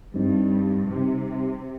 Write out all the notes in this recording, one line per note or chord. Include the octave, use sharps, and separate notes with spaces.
G2 G3 C4 D#4
C3 G3 C4 D#4